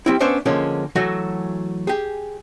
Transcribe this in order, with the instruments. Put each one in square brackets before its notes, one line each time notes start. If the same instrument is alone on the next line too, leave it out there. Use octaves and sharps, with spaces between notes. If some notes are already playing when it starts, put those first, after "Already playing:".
[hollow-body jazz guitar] G3 C4 E4
B3 C#4 D4 C5 E5
D3 F3 G#3 A#3 C#4
E3 F#3 A3 F#4
G4 G#4